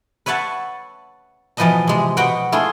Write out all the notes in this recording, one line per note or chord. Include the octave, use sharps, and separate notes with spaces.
B4 C#5 E5 F#5 A5
B2 E3 F3 B4 D#5 A5
C3 G#3
B2 F#4 B4 F#5 G5
A3 E4 F4 G#4